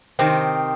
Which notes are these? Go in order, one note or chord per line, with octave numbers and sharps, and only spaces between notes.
C3 D#3 C4